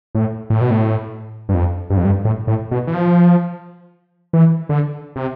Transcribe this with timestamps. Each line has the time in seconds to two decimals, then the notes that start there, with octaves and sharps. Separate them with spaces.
0.15 A2
0.50 A2
0.61 B2
0.71 A2
1.49 G2
1.54 F2
1.90 G2
1.97 F2
2.05 G2
2.25 A2
2.47 A2
2.71 B2
2.87 E3
2.94 F3
4.33 E3
4.69 D3
5.16 C3